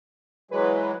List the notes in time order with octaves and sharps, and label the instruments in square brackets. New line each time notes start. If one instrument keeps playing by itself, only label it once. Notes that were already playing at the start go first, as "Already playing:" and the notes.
[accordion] E3 F#3 G#3 [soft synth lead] B4